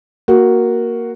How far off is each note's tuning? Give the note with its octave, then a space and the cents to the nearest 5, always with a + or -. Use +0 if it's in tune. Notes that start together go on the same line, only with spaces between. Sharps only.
A#3 +0 F#4 +0